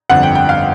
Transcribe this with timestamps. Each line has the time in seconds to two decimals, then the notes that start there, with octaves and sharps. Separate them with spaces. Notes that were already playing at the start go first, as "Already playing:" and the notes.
0.10 G1 F2 D3 F#5
0.23 G5
0.35 G5
0.49 F5